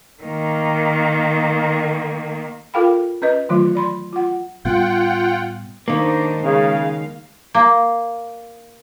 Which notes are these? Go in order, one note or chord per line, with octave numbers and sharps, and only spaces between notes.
D#3 A#3
F4 A4 A#4 F5 G5 B5
C#4 B4 D#5
D#3 E3 F#3 A3 F4
D5 B5 C6
F4 F#5
A2 G3 B3 F4 F#5 G5
D#3 A#3 D4 D#4 C5
C#3 G#3 F5
A#3